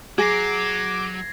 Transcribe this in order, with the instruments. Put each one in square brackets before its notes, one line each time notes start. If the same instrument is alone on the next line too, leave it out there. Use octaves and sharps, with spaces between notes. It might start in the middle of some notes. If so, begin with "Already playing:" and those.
[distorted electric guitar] F#3 [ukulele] G#4 [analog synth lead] D6 [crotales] G#6 A#6 C7